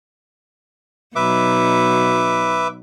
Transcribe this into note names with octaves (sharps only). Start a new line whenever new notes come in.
B2 F#3 D#4 B4 E5 D6